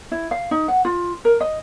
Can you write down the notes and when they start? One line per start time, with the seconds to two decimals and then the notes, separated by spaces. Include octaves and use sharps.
0.12 E4
0.31 F5
0.51 D#4
0.68 F#5
0.85 F4
1.25 A#4
1.40 D#5